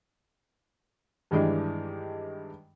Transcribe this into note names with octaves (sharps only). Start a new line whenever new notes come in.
G2 D#3 E3 G#3 D4 G4